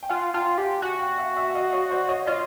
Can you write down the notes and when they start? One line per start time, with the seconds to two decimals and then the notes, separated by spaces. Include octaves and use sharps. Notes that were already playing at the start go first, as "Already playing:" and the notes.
0.03 G5
0.09 F4 F#5 G#5
0.34 F4 G5 A5
0.58 G4 F#5 G#5
0.82 F#4 F#5 G#5
1.00 F5 G5
1.18 E5 F#5
1.36 E5 F#5
1.54 D#5 F5
1.73 C#5 D#5
1.91 C5 D5
2.09 C#5 D#5
2.27 F4 C#5 D#5